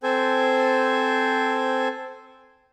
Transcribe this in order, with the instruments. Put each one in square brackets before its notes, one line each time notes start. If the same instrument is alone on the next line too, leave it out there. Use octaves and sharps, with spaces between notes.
[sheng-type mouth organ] C4 A4 C5 G#5